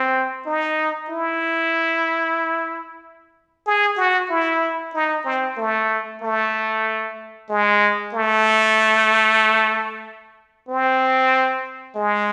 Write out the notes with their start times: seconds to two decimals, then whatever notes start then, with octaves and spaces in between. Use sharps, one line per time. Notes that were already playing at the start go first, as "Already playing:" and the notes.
Already playing: C4
0.46 D#4
1.09 E4
3.66 G#4
3.97 F#4
4.30 E4
4.94 D#4
5.25 C4
5.58 A3
6.22 A3
7.49 G#3
8.14 A3
10.69 C4
11.96 G#3